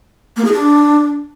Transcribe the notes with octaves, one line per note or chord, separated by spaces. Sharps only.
A#3
G#4
D4